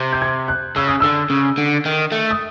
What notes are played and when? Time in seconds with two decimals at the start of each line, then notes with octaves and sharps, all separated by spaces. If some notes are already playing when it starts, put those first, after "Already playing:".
Already playing: C3
0.13 G6
0.22 G#6
0.48 F#6
0.76 C#3 E6
0.88 D#6
1.00 D3 E6
1.30 C#3
1.58 D3
1.85 D#3
2.12 A3
2.31 D#6